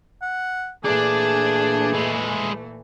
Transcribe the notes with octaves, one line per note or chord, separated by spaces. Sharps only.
F#5
A#2 E3 A3 D4 G#4 D5 G#5
G#3 E4